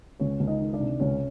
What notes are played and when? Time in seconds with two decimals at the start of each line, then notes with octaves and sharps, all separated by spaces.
0.20 C#2 C#4 C#5
0.40 C#2
0.47 D#4 D#5
0.61 D#3
0.73 D4 D5
0.80 C3
1.00 C#2 C#4 C#5